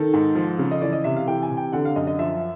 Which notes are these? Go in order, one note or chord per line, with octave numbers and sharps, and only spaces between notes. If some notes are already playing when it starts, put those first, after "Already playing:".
Already playing: D#3 A4
G#2
F3
C#3
D#5
E3 D5
D#5
C3 E5
F5
E3 G5
G#5
C3
G5
D3 F#5
F5
F#2 D#5
D#5
F3 E5